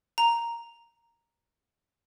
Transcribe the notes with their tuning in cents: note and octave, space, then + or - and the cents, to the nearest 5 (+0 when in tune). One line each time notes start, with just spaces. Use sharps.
A#5 +0